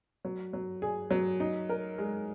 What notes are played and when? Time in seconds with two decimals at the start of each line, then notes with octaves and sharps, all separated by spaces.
0.25 F#3
0.53 F#3
0.82 G#4
1.11 F#3
1.40 D#4
1.69 A#4
1.98 G#3